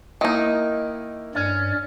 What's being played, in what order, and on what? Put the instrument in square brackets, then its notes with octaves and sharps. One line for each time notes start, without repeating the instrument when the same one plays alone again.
[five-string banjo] D#3 D#4 [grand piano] A#3 E4 [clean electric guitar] D#5
[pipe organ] G2 D5 [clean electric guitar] C#4